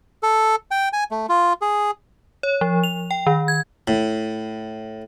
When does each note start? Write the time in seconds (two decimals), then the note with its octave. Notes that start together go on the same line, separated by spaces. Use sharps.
0.23 A4
0.71 G5
0.93 G#5
1.11 A3
1.29 F4
1.61 G#4
2.43 C#5
2.61 F3
2.83 F7
3.11 G5
3.27 D#3
3.48 G#6
3.88 A2